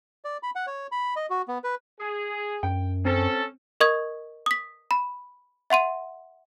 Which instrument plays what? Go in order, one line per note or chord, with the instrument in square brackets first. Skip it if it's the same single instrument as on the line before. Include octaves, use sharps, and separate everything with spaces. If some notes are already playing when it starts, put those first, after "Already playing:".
[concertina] D5
B5
F#5
C#5
B5
D#5
F#4
B3
B4
[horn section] G#4
[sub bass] F#2 [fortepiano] G5
[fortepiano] C4 [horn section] C#4 A4
[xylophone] A#4 D#5 C#6 D#6 G#6
D#6 B6
B5
E5 F#5 C6 D#7